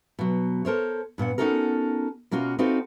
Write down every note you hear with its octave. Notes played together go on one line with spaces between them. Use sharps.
B2 F#3
A4 A#4 C5 C#5
G2 A#2 B3 F#5
B3 C#4 D#4 F#4 A4 A#4
B2 A#3 C#4 F4 F#4
C4 D#4 F4 F#4 A4 B4